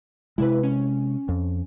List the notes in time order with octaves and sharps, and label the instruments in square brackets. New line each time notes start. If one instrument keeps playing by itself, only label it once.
[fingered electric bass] C3 G#3 [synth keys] E4 B4
[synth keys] C#4
[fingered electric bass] F2